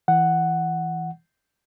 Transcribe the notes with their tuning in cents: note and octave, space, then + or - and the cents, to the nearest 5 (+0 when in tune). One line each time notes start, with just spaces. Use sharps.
E3 +0 F#5 +0